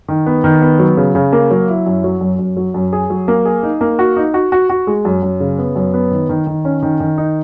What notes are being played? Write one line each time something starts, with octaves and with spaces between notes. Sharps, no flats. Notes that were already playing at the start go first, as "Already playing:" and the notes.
D#3
B3
D#3
B3
F#3
C#3
C#3
A#3
F#3
E4
F#2
F#3
F#2
F#2
F#3
F#2
G#4
F#3
A#3
G#4
D#4
A#3
F#4
D#4
F#4
F#4
F#4
G#3
F#2
F#2
C#3
B3
F#2
B3
D#3
D#3
D#3
C#4
D#3
D#3
D#4